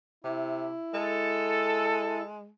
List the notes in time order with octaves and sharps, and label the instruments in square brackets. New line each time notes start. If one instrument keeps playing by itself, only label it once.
[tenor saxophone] C3 [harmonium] E4
[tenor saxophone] G#3 [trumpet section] A4